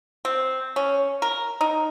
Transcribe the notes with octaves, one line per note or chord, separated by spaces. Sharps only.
C4
C#4
A#4
D#4